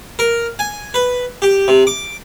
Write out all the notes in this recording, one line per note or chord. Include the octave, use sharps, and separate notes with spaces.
A#4
G#5
B4
G4
C3
D6